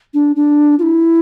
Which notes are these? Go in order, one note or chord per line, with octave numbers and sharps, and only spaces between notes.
D4
D4
F4
E4